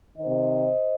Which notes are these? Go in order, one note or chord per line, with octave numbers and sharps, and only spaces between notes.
C3 D#3 C5 D#5